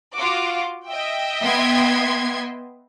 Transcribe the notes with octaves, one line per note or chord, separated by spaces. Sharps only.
F4 F#4 D6
D#5 E5 G5
B3 C6 G#6